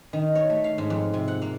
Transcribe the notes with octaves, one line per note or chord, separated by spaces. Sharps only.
D#3
C#5
A3
F5
G#2
F2
C3
F#5
A#3